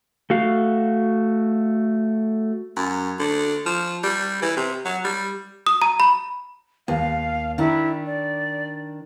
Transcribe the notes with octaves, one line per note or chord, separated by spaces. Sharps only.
A3 F#4 F5
F#2
D3
F3
G3
E3
C3
F#3
G3
D#6
A#5
B5
D#2 F5
D#3 D4 E4
D5